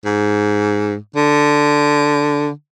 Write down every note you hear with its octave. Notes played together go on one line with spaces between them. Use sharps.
G#2
D3